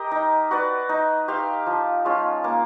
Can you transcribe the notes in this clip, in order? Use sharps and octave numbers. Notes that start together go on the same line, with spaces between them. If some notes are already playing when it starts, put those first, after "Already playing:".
Already playing: G4 A#4 D#5
D#4
F#4 B4 D5
D#4
G4 C5 F5
F3
G#3 C#4 F4
A#3